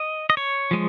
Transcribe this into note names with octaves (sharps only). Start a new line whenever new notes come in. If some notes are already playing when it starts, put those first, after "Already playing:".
Already playing: D#5
D#5
C#5
F3 G#3